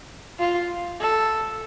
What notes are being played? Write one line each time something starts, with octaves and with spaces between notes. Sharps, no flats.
F4
A4